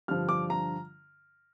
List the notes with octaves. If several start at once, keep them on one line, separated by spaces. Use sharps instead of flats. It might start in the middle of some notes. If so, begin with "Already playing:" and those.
G2 D3 F3 F6
D6
A#5